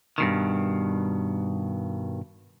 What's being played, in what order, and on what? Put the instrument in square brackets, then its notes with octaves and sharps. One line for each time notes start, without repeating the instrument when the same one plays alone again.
[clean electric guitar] G2 B2 D#3